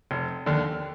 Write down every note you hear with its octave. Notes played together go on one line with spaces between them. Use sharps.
F1
D#2 D3